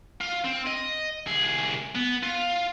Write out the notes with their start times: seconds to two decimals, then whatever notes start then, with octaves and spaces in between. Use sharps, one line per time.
0.21 F4
0.45 C4
0.67 D#5
1.27 C2 G#4
1.95 B3
2.23 F4